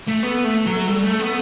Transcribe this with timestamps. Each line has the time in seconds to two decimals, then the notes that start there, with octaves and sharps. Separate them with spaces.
0.08 A3
0.24 B3 A4
0.45 A3
0.66 F#3
0.87 G3
1.04 A3
1.20 B3